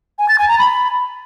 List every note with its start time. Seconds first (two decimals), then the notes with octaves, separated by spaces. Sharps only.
0.19 G#5
0.29 A6
0.39 G#5
0.48 A#5
0.58 B5